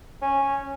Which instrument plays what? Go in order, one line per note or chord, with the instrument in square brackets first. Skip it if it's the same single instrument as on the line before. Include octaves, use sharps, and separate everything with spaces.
[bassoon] C#4